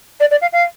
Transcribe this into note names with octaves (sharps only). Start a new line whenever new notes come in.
D5
D5
F5
F5